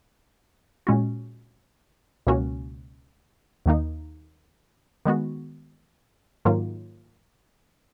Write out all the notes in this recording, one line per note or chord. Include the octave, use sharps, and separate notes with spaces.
A#2 G#3 C#4 F#4
C#2 B2 A#3 C#4 F#4
D#2 D#3 A#3 D#4
D#3 G#3 B3 F#4
G#2 D#3 F#3 A#3 F4